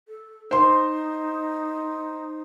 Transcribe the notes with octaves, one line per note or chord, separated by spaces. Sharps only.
A4
D#4 C5 C6